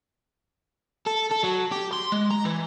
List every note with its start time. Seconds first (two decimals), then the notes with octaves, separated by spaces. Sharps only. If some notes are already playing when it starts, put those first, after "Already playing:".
1.07 A4
1.31 A4
1.44 F#3
1.72 G4
1.93 C6
2.12 G#3
2.31 A#5
2.45 E3